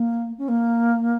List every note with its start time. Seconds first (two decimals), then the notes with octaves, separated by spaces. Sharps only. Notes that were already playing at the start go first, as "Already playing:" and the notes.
Already playing: A#3
0.38 C#4
0.48 A#3